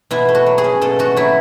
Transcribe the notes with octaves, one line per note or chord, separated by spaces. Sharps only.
B2 E4
A3
F#4
F#3
G#4
C#4
B2 A4
A3 F#4
F#3 E4